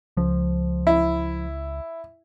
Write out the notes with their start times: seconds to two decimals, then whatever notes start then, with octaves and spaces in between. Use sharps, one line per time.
0.17 C#2 F3
0.87 E4